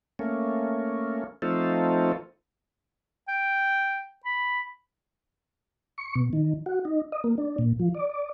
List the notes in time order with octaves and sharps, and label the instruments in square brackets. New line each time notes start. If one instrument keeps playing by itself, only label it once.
[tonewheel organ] A3 A#3 C#4
F3 A3 C4 D#4 F4 A4
[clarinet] G5
B5
[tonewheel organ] C#6
B2
D#3
F#4
D#4
D#5
A#3
D4
A#2
F3
D5
D5